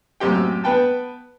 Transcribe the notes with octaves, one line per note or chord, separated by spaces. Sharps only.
A1 F#2 C4 G4 G5
B3 B4 G5 A5